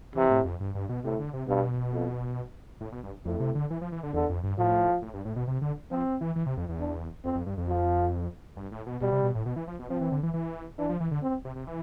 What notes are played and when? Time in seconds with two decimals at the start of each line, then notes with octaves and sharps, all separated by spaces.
0.15 C3 E3
0.30 A2
0.45 F2
0.60 G2
0.75 G2
0.89 B2
1.04 A2 C3
1.19 D3
1.33 C3
1.48 G2 B2
1.93 F2
2.81 A2
2.92 B2
3.03 G2
3.25 F2 A2
3.40 C3
3.55 D3
3.70 E3
3.81 F3
3.92 E3
4.03 D3
4.14 E2 D3
4.29 F2
4.43 G2
4.58 A2 F3
5.02 A2
5.14 G2
5.25 A2
5.36 B2
5.47 C3
5.62 D3
5.91 F3 C4
6.21 E3
6.36 E3
6.46 C3
6.57 F2
6.69 E2
6.79 D4
7.24 F2 C4
7.35 F2
7.46 G2
7.57 F2
7.68 F3
8.57 G2
8.72 A2
8.86 B2
9.01 B2 G3
9.12 C3
9.23 B2
9.35 A2
9.46 B2
9.56 E3
9.68 F3
9.79 B2
9.89 F3 C4
10.01 E3
10.12 D3
10.23 E3
10.34 E3
10.78 E3 D4
10.89 F3
11.00 E3
11.11 D3
11.22 C4
11.45 C3
11.56 C3
11.67 E3